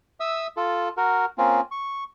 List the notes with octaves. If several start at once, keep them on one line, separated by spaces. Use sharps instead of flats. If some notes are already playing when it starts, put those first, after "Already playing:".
E5 D#6 E6
F4 A4
F#4 A#4
A#3 C4 C#4 F4
C#6